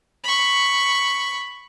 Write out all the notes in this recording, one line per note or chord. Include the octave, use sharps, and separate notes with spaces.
B5 C#6